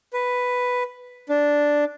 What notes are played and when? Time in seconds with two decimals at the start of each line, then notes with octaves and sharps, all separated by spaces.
0.13 B4
1.29 D4